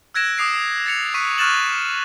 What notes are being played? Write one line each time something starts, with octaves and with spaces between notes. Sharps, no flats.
E6 F#6 G#6 A#6 D7 E7
D6 D#6 C7 D7
E7
A6 A#6 C#7 F7
C#6 F#6 B6 D#7
C#6 F6 F#6 A6 E7 F#7